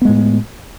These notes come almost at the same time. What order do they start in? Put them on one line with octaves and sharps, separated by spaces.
B3 G#3 A2